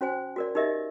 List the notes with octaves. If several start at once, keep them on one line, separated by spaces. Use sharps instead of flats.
C#4 F#4 C5 G#5
F#4 A#4 D5
D#4 G4 A#4 D#5 E5